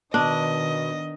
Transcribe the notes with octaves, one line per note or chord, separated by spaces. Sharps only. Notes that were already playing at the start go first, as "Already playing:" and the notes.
B2 D#3 D4 D#5